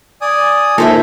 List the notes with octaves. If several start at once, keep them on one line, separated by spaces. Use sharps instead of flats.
D5 G#5 D#6
A2 D#3 A#3 F4 A4 C5 E5